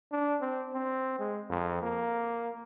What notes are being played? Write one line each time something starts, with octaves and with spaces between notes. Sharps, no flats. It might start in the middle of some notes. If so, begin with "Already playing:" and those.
D4
C4
C4
G#3
F2
A#3